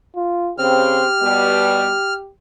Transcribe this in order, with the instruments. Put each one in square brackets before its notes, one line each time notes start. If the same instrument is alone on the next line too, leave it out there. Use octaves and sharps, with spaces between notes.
[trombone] F4
[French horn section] C#3 C4 [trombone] G4 [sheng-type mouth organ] F6
[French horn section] B2 G3 B3